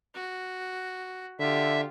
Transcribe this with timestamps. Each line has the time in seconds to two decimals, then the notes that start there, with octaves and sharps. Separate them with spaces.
0.14 F#4
1.39 D3 F4 G4 E5